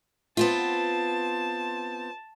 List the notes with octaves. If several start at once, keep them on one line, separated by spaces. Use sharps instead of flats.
B3 C4 F4 A5